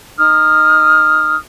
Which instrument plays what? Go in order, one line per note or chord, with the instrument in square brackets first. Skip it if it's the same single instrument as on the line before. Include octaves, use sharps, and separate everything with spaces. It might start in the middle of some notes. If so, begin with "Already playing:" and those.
[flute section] D#4 D#6 F6